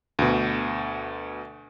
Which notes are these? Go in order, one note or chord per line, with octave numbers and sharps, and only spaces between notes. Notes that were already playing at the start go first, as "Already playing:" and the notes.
D2 B2